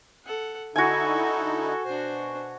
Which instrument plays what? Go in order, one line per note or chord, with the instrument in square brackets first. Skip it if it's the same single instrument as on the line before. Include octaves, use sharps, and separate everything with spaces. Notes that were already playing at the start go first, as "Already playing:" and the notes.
[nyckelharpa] A4 F#5
[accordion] D3 D#4 E4 [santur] F#4 G#5 [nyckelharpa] A4
[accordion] B2 [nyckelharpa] D4 C5